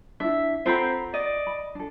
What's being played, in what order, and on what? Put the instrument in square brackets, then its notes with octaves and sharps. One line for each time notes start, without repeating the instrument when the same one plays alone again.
[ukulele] D4 E4 [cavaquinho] E5
[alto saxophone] C4 [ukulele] F4 A4 F#5 [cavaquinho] C5 A#5 B5
[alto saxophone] D5 [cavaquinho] D#5
[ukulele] B5
D4 A4